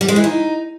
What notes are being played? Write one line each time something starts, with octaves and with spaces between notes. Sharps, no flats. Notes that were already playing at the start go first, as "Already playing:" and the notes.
G3
G#3
E3
D#4